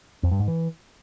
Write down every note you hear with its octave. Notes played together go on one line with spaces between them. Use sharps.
F2
G2
G#2
E3